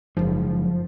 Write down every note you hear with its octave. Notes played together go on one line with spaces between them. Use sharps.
F#1 G#2 F3